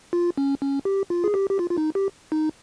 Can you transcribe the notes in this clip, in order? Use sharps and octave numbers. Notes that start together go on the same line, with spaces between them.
F4
C#4
C#4
G4
F4
G#4
G4
G4
F4
F4
D#4
G4
D#4